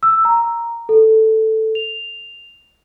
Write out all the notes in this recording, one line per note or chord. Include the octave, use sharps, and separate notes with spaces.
E6
A#5
A4
F7